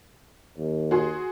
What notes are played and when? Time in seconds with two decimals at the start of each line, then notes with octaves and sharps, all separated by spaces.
0.58 D#2
0.91 F#4 G#4 C6